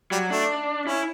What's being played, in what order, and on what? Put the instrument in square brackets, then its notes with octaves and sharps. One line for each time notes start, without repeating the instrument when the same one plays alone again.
[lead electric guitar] F#3 [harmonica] G3
[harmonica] A3 [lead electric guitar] D4
[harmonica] C#4 [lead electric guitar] E4